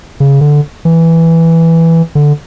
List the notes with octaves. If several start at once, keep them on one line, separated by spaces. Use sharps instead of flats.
C#3
D3
E3
D3